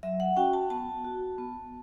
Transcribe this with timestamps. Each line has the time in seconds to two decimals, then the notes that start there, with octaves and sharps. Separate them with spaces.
0.03 F#3 E5
0.20 F#5
0.37 C#4 F#4 G5
0.53 A5
0.70 B3 A5
1.04 F#4
1.38 B3